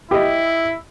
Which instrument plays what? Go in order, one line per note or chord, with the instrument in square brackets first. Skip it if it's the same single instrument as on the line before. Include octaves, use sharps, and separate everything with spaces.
[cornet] E4 [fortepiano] G4 D#5